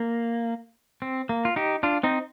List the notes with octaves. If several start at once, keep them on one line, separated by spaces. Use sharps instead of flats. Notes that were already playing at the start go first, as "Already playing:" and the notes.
Already playing: A#3
C4
A#3
F4
D#4 G4
D4 F4
C4 D#4